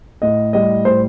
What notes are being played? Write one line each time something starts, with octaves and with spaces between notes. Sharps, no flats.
A2 D#5
G3 D#5
A2 C5